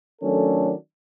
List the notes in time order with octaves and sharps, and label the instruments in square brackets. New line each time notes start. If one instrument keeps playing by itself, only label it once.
[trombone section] D#3 F#3 A3 C#4 D4 A4